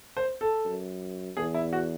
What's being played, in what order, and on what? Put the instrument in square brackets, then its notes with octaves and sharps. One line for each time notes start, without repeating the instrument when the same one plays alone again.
[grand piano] C5
A4
[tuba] F#2
[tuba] E2 [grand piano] G#4
[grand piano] E4
F#4